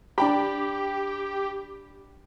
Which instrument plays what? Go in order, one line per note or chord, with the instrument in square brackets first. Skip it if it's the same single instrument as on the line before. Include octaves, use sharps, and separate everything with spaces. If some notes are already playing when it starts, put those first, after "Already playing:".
[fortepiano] D4 G5 B5 [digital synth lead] G4